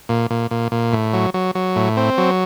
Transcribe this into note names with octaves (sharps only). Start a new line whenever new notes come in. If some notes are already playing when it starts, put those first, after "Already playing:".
A#2
A#2
A#2
A#2
A2
F#3
F#3
F#3
A2
C4
F#3